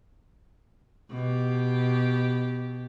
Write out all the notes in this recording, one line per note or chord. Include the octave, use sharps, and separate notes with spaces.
B2 G4